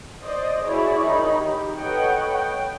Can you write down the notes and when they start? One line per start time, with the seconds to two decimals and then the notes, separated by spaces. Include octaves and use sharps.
0.23 C5 D5 D#5
0.64 E4 F#4 G#4 C#5 D5
1.04 D#3 D#4 B5
1.37 G4
1.77 A4 B4 C#5 D#5 F#5 G5
2.31 G5